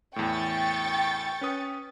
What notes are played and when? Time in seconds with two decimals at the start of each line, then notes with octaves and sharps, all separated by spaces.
0.16 E2 A2 G5 C#6 A6
1.41 C#4 B4 D#6